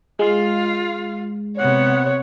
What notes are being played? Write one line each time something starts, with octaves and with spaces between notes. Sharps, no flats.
G#3 F4 F5
C3 B3 C#5 F#5